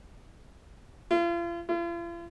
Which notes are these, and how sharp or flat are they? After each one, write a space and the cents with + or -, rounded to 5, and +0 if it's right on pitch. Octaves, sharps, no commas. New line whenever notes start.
F4 -40
F4 -45